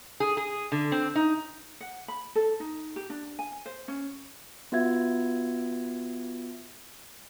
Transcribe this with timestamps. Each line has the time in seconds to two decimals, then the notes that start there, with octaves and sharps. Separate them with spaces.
0.20 G#4
0.37 G#4
0.72 D3
0.92 C4
1.15 D#4
1.81 F#5
2.08 B5
2.35 A4
2.60 D#4
2.96 G4
3.10 D4
3.39 G#5
3.66 C5
3.88 C#4
4.72 B3 F4 F#4 E5 G#6